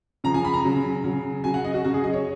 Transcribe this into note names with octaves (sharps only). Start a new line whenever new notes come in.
C#3 F3 A#5
G#5
B5
A#5
C#3 F#3
C#3 F#3
C#3 F#3 G#5
F#5
D#5
F#4
C#3 F#3 F#4
G#4
D#5
C#5